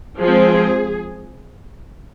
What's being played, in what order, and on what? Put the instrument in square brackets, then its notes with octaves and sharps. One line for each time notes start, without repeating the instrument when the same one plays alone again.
[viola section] F3 G#3 C4 G#4